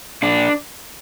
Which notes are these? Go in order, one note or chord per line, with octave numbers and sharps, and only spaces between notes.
A#2 D4